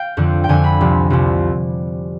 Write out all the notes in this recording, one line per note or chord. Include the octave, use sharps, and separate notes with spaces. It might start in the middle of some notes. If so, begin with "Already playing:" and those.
Already playing: F5 G5
F2 D3 F3
G5
F2 D3 F3 G#5
B5
C2 C3 F3
C2 C3 F3